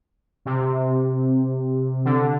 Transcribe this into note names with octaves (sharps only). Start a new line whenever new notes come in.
C3
D3